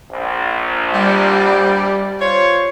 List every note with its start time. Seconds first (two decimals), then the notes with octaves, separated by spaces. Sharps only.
0.10 A#1
0.94 G3
2.21 F4 C5 C#5